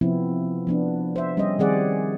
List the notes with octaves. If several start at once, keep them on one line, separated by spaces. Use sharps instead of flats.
C3 F3 B3 C4 E4
F3 B3 D4
C5 E5
G3 C#4 G4 D#5
D#3 G3 C4 G#4 D5 F#5